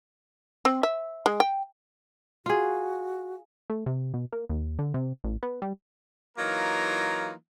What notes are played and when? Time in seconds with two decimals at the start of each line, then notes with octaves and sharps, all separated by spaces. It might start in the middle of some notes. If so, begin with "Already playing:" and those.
0.65 C4
0.83 E5
1.26 G#3
1.40 G5
2.46 F4 F#4 G#4
3.70 A3
3.86 C3
4.14 B2
4.33 A#3
4.49 D#2
4.79 D3
4.94 C3
5.24 A1
5.43 B3
5.62 G3
6.37 E3 F#3 A#3 D#4 F4 A#4